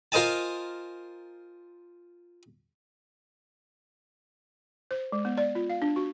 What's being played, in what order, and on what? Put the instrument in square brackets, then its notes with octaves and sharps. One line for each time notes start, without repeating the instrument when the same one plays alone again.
[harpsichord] F4 A#4 C5 D#5 G#5 A5
[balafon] C5
G#3
B3
D5
F4
F5
D4
F#4